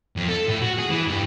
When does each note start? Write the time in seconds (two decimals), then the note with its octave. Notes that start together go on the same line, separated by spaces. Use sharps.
0.16 F2
0.28 A4
0.48 A2
0.62 F#4
0.79 G#4
0.90 E3
1.08 G2